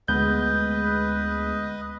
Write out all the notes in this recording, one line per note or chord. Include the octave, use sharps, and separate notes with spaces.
D2 G#3 B3 B4 D#5 G6